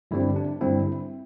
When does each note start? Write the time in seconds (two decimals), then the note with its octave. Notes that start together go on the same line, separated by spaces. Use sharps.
0.11 G2 D3 G3 C4 E4
0.36 D4
0.61 G2 D3 G3 C4 E4